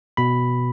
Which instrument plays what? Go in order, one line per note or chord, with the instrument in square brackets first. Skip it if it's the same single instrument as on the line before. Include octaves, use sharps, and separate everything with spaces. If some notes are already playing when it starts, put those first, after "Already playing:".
[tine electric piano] B2 B5